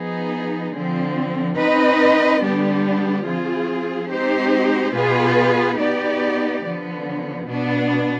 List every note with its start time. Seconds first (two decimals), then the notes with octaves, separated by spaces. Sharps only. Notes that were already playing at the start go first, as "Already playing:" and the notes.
Already playing: F3 B3 D#4 G#4
0.74 D3 F3 C4
1.58 C4 D#4 B4 D#5
2.42 D3 G3 B3 D4 G4
3.26 F3 C4 F4 G#4
4.10 G#3 C4 D#4 G4 C5
4.95 B2 B3 F4 G#4 B4
5.79 B3 D#4 G4 D5
6.64 D3 F3 B3
7.47 B2 B3 D4